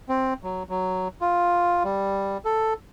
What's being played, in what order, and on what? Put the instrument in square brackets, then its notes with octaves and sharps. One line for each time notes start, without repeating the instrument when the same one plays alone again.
[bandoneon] C4
F#3
F#3
F4
G3
A4